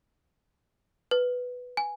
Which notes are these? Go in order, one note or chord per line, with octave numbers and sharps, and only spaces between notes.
B4
G#5